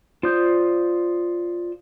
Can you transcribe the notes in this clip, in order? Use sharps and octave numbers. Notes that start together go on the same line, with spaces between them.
F4 C5 D5 D#6 G6